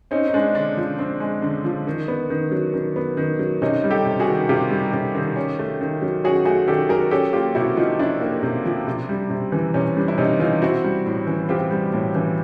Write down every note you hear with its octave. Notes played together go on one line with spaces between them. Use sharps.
C4 C#4 D#4
D#4
G#3 D4
D3 D4
F3
C4 D4
G#3
D3
F3
D#3
B3
D#3
F#3
D#3
B3
D#3
F#3
C3 C#4 D#4
G3
G4 A4
C3
F#4 G#4
D#3
C3 F4 G4
G3
C3
D#3
C#4
A3
D#3
F#3
C#4 F#4 G#4
A3 F#4 G#4
D#3 G4 A4
F#3 G#4 A#4
C#4 G4 A4
A#3 F4 G4
C3 E4 F#4
F3 D#4 F4
C#4 D4 E4
A#3
C3
F3
C3
G3
C3
E3
C3 C#4
G3 D4
E4
C3 C#4 D#4
E3 D#4 F4
C4 E4 F#4
G3
A2
E3
C4 F4 G4
G3
A2
E3